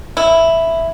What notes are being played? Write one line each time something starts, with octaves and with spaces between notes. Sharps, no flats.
E4